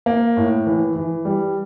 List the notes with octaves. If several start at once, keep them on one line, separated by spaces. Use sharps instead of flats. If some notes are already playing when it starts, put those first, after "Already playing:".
A#3
A2
E3
E3
G3